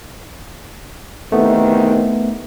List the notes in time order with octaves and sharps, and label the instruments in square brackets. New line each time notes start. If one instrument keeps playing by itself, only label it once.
[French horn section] E2 C3 D#3 [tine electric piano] A3 B3